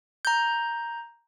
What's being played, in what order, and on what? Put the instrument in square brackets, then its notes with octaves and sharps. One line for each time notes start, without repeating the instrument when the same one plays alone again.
[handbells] A#5 G6